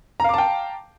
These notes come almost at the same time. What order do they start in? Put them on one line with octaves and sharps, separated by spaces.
A#5 F5 D6 A5 G5